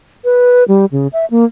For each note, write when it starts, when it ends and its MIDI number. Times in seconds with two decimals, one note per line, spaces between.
0.24 0.64 71
0.68 0.86 55
0.92 1.07 49
1.13 1.26 76
1.31 1.45 58